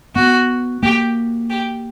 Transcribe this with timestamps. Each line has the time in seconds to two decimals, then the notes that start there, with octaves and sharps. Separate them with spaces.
0.15 B3 F#4
0.82 A#3 G4
1.50 G4